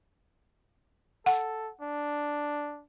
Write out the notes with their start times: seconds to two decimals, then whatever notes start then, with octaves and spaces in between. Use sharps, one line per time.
1.26 A4 F#5
1.81 D4